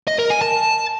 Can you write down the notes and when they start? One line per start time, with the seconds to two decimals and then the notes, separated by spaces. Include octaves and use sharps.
0.08 D#5
0.19 A#4
0.30 G#5
0.41 A5